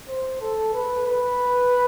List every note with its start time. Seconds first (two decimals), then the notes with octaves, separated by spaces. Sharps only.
0.08 C5
0.41 A4
0.73 B4
1.06 B4